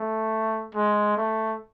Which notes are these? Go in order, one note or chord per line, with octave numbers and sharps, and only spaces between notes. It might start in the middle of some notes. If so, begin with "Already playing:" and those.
Already playing: A3
G#3
A3